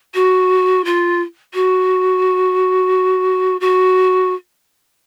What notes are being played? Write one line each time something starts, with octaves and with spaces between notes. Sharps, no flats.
F#4
F4
F#4
F#4